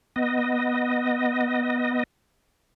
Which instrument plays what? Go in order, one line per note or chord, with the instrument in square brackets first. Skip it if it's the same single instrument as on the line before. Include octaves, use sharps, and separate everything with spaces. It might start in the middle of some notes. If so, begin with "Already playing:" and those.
[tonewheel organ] B3 D#5